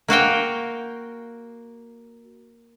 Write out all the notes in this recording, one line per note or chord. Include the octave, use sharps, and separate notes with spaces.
A#3 F#4 F5 G5